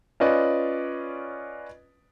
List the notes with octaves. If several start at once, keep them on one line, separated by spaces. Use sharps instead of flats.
C#4 F4 B4 D5 D#5